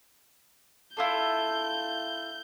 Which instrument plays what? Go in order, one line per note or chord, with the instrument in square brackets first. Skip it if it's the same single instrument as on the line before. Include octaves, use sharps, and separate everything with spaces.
[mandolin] E4 F4 A4 [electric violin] G6